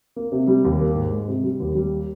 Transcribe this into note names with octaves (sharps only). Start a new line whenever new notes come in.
A#3
C3
G3
D#2
A#3
G#2
G#3
C3
G3
D#2
G3